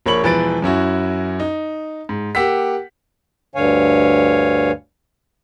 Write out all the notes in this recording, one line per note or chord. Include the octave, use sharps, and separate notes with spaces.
A#1 A#3 C#5 B5 C#6 F#7
E1 E3 F3 B4 A6 D7
F#2 C#4 E4 F#4
D#4
G#2
A#3 G4 F#5 E6 B6
D2 G2 D3 C#5 F5 G#5